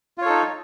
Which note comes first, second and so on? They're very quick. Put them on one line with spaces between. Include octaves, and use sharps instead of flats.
F4 C#5 A4 D#4